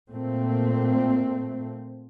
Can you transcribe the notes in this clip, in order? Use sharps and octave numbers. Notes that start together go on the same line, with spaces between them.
A#2 A3 C4